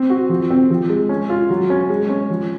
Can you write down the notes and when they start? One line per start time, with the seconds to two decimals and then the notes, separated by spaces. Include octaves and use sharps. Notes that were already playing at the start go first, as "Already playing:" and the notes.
Already playing: C4
0.10 F#4
0.29 F3
0.50 C4
0.70 F3
0.89 G#3
1.09 C#4
1.30 F4
1.50 F#3
1.70 C#4
1.89 G#3
2.09 C#4
2.30 F3